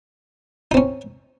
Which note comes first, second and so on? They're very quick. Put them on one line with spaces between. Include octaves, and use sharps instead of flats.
D#4 C4 C#4